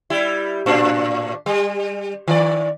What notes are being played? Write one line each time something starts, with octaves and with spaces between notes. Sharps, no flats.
G3 E4
A2 D4
G3
D#3 D5